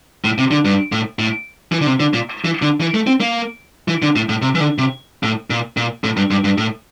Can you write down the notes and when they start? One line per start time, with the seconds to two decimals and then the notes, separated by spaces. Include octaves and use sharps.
0.25 A2
0.38 C3
0.51 D3
0.65 G2
0.92 A2
1.19 A2
1.72 E3
1.81 D3
1.87 C3
2.00 D3
2.14 A#2
2.45 E3
2.62 D3
2.80 E3
2.94 A3
3.07 C4
3.20 A#3
3.88 E3
4.02 D3
4.16 A2
4.29 A2
4.42 C3
4.55 E3
4.60 D3
4.78 C3
5.23 A2
5.50 A#2
5.77 A#2
6.04 A2
6.17 G2
6.31 G2
6.44 G2
6.58 A2